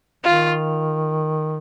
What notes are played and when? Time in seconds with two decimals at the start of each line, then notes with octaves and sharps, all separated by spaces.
0.24 D#3 F4